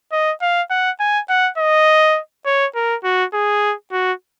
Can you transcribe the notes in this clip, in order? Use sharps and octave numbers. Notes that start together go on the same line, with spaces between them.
D#5
F5
F#5
G#5
F#5
D#5
C#5
A#4
F#4
G#4
F#4